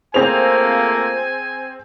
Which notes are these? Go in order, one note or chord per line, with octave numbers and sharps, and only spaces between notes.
A3 A#3 C4 F4 G#4 C5 G#5 F7